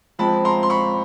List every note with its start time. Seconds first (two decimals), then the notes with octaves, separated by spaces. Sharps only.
0.19 F3 G#3 C4 A5 B5
0.45 A#5 C6
0.63 C6
0.70 B5 C#6